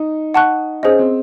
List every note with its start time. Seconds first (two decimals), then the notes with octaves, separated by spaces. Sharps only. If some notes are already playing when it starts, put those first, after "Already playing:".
Already playing: D#4
0.34 F#5 A5 C#6 F#6
0.83 C#4 G#4 C5 D#5
0.99 C4